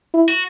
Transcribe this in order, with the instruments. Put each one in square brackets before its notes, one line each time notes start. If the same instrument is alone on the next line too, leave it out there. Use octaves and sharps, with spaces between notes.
[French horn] E4
[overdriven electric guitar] F#4